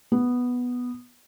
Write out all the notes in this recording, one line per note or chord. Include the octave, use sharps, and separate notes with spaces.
B3